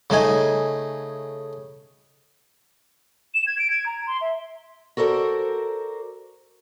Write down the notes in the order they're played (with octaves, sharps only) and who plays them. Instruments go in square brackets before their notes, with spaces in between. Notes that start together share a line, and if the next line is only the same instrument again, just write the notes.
[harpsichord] C#3 A3 D#4 G#5
[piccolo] E7
G#6
D7
G#6
A#5
C6
E5
[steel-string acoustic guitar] F#4 A4 A#4 C5 D5